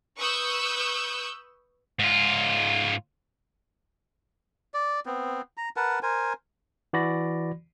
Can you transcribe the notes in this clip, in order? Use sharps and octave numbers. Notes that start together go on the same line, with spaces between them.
B4 C#6 D#6 E6 F#6 G6
G#2 F4
D5
B3 C4
A#5
A#4 B4 F#5 A5
A#4 C5 G#5
E3 F#4 D5 B5 A#6